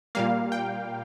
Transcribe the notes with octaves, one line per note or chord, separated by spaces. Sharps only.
A#2 G3 A#3 F5
G5